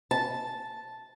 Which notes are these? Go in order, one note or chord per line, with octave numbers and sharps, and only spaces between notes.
A5